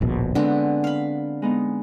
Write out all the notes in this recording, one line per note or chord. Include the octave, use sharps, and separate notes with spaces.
D1 A#1 B2
D3 G#3 B3 C4 D4
F5 B5
G#3 B3 D#4